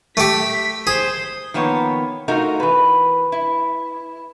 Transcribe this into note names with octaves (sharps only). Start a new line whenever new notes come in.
A3 G4 B6
G#4 C5
D#3 F3 A#3 B3 C#5
A3 D#4 F4 F#4 A#4
E3 B4
E4